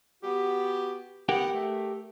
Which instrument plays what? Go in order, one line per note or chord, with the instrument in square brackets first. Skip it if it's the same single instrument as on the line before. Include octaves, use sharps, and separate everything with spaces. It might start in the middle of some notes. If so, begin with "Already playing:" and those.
[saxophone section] B3 F#4 G4
[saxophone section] B3 F#5 [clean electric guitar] G4 A#4 G5
[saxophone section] A3